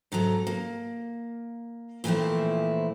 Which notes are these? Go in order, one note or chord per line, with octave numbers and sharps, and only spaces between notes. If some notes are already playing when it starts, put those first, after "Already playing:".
G#2 C3 F#3 A4 A#5
A#3
A#2 E3 F3 A3 C4 E4